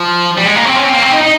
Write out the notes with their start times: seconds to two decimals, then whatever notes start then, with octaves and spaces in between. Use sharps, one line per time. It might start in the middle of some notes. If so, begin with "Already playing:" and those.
Already playing: F3
0.37 G3
0.46 G#3
0.55 A#3
0.64 C4
0.75 C#4
0.84 C4
0.93 A#3
1.02 C4
1.11 D#4
1.21 D#4